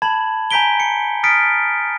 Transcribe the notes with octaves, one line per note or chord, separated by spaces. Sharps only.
A5 B5 G#6 F#7
G#5 A#5 G6 B6 D7 G7
C#7
D#6 F6 A6 B6 C#7 D7